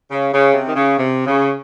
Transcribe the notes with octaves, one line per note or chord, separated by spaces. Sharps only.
C#3
C#3
C3
D#3
C#3
C3
C#3